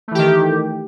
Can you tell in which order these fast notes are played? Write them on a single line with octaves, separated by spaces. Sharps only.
A3 E3 G4 D#3